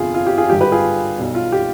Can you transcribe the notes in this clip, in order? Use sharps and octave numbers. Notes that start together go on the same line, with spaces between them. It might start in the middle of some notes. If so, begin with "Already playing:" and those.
Already playing: G1 F2 C3 F4 G#4
F4
G4
F4 G#4
G#1 G2 D3 G3 G4
G4 B4
F4 G#4
B1 B2 G3
F4
G4